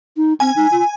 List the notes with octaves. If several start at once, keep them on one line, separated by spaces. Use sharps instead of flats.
D#4
C4 G#5
D#4
F4